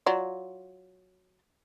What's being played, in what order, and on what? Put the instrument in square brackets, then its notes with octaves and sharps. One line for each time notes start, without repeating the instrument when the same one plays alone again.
[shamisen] F#3 F4 D5